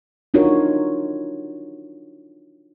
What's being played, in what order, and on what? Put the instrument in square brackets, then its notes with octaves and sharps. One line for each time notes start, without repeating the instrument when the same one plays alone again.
[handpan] D4 D#4 F4 F#4 A#4 C#5